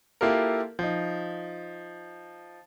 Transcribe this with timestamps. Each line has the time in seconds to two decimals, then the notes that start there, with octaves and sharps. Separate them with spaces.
0.21 A#3 E4 F4 G4 A4 A#4
0.79 F3 D#4